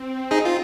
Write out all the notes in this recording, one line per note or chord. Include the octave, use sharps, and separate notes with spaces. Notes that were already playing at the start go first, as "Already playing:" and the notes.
Already playing: C4
D#4 G#4
F4